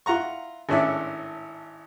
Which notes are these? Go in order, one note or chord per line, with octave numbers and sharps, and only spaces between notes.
E4 F4 F#5 A#5 C#6
G#1 A2 C#4 D4 E4 E5